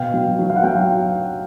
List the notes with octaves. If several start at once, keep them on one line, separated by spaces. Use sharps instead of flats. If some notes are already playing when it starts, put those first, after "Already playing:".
Already playing: B2 F5 G5
F#3
F#3
F5
F#5
F#3 F5 G5